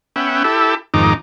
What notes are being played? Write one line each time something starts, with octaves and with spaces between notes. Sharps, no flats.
B3 C#4 E5 F#5 G5
E4 G4 A4
F2 G#2 D#3 D#4 D6